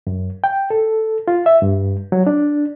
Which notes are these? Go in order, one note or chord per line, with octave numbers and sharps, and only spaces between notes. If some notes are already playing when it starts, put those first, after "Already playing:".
F#2
G5
A4
F4
E5
G2
F#3
D4